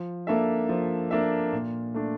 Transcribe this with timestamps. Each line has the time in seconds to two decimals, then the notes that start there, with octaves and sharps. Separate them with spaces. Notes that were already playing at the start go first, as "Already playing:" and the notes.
Already playing: F3
0.27 A#3 D4 A4 E5
0.69 F3
1.11 A#3 D4 A4 E5
1.53 A#2
1.94 A3 D4